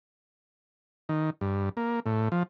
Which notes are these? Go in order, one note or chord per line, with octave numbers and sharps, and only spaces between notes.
D#3
G2
A#3
A2
F3